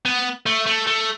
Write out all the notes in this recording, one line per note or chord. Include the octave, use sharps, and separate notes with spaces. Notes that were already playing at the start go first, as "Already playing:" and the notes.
B3
A3
A3
A3